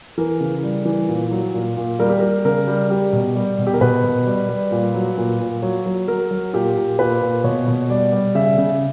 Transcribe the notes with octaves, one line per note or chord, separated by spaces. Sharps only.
E3 A#4
C#3
G3
E3
A#2
F#3
A#2
A#2
G3 A#4
G4
G3 A#4
C#3 A#4
G3
G3 G4
B2
G3
B2
G4
A#4
B2 B4
B2
G3
G3
A#2
F#3
A#2
A#2
F#3 C#5
F#3
F#3 A#4
F#3
A#2 G4
A#2
A#2 B4
A#2
B2 C#5
B2
G3 D5
G3
C#3 E5
C#3